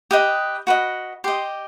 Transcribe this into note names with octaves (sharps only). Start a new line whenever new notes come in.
G4 B4 D#5 D#6
F#4 B4 D#5
G4 D#5 C6